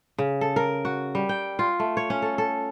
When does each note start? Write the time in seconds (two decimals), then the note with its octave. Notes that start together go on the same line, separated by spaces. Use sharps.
0.18 C#3
0.41 A4
0.56 A#4
0.85 F#4
1.15 G3
1.29 G5
1.59 F4
1.80 A3
1.97 C#5
2.10 C#4
2.22 A4
2.38 A4